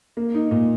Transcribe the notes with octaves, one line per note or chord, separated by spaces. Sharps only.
A#3
D#4
A#2